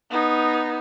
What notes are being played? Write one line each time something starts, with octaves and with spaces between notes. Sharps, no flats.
B3 D#4